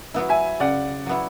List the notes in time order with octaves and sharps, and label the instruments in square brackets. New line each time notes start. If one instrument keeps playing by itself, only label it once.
[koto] F#3 B3 E4
[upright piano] E5 G#5
[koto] C#3 [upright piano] D5 F#5
[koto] F#3 B3 E4